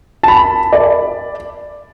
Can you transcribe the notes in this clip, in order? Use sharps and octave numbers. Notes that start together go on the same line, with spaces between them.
A5
B5
D5